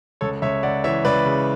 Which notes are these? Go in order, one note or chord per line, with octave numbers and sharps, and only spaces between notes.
C#2 A4 C#5
C#2 C#5 E5
C#2 D5 F#5
E3 C#5 E5
C#2 B4 D5
C#3